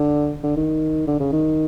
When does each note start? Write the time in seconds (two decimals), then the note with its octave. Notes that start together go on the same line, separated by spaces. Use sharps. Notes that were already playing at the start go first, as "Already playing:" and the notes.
Already playing: D3
0.43 D3
0.57 D#3
1.07 D3
1.20 C#3
1.32 D#3